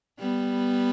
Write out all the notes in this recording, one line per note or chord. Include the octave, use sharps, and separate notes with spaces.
G3 B3